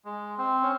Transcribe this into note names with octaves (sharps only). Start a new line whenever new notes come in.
G#3
C4
C#4